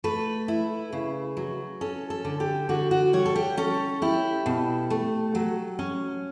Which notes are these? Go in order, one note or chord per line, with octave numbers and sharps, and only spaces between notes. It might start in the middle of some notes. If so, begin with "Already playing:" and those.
A3 B4
E4
C#3
F#3
C#4 A4
A4
D3
G4
D3 F#4
F#4
G3 C#5
A4
G4
C#4 A4
E4 G4
B2
A3
F#3
C#4